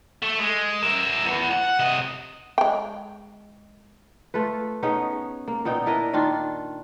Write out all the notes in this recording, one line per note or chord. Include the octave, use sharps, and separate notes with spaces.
A3
G#3
A#4 E5
E2 B3
F#5
C3 D#5
G#3 G5
A3 F4 B4
B3 C#4 D#4 G#4
A#3
A#2 B3 D#4 G5
D4 E4 A#4 D#5
D#3 D4 F4 F5